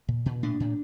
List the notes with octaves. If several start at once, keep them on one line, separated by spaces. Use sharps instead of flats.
A#2
A#2
A2 D4
A2